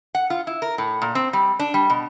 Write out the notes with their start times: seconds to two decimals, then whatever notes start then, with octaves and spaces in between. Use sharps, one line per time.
0.15 F#5
0.30 F4
0.47 E4
0.62 A#4
0.78 A2
1.02 A#2
1.15 C4
1.33 G3
1.59 D4
1.74 G3
1.90 B2